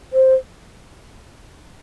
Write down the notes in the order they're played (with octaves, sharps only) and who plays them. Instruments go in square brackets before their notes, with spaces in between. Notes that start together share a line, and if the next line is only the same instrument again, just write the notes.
[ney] C5